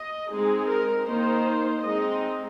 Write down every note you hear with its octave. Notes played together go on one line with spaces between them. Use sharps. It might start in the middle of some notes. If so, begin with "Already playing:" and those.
Already playing: D#5
G#3 C4 D#4 G#4
A#4
D#3 A#3 D#4 C5
G#3 C4 D#4 D#5